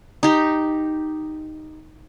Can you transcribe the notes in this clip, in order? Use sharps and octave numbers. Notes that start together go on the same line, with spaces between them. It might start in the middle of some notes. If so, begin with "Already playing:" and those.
D#4 G4